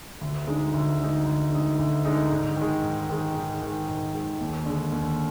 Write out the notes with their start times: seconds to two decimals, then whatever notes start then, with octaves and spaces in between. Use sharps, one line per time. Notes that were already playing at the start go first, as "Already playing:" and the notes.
0.21 D2
0.47 D3 G#3 D#4
0.74 D2
1.00 D3 G#3 D#4
1.26 D2
1.52 D3 G#3 D#4
1.79 D2
2.05 D3 G#3 D#4
2.31 G#2
2.57 D#3 G#3
2.83 G#2
3.09 D#3 G#3
3.35 G#2
3.62 D#3 G#3
3.89 G#2
4.14 D#3 G#3
4.40 D#2
4.66 D3 G#3
4.92 D#2